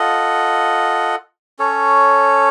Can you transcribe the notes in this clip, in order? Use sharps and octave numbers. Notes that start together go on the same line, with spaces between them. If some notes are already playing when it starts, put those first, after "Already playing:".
Already playing: F4 A4 D#5 F#5
C#4 A4 C#5